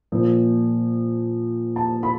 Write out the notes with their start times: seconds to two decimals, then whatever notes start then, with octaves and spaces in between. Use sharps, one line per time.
0.12 A#2 F3
1.76 A5
2.03 B5